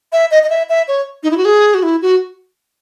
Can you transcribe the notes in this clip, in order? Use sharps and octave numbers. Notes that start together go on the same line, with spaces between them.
E5
D#5
D#5
E5
E5
C#5
D#4
E4
F#4
G#4
F#4
E4
F#4